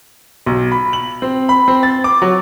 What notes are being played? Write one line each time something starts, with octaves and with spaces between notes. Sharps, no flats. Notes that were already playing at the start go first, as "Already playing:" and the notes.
B1
B5
F#7
C4
B5
C4
A6
D6
F#3